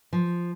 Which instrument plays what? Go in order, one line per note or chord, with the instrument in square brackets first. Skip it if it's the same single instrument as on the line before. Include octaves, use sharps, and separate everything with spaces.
[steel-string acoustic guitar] F3